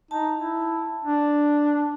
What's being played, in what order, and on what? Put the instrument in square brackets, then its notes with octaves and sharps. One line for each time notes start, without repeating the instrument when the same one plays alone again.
[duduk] D#4 [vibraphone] A5
[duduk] E4
D4